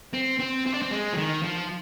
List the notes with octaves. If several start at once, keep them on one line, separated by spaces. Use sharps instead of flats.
C4
C4
C4
D4
C4
G#3
F3
D#3
F3